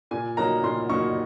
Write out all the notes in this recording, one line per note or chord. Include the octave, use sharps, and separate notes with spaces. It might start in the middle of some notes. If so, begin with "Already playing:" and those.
A#2 G#5
F#3 A#3 D#4 A#5
A#2 C6
F#3 A#3 D#4 C#6